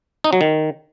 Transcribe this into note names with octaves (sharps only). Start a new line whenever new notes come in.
D#4
F#3
D#3